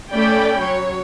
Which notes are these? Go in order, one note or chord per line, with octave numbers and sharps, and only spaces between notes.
A3 C#4 D5 G5 B5
F#3 C#5